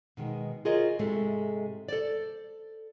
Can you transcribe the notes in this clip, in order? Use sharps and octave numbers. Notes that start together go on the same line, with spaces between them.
B2 D#3 G#3
F4 F#4 G#4 A#4 C#5 D#5
G#2 C3 G#3 A3
A4 C5 D5